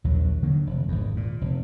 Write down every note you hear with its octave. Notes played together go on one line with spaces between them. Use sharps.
A#1 D#2 F#3
D3 D#3 F#3 A#3
F1
G#1 E2
A#2
F1